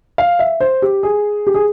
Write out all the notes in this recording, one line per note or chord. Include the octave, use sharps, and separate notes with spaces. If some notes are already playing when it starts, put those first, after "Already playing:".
F5
E5
C5
G4
G#4
G4
G#4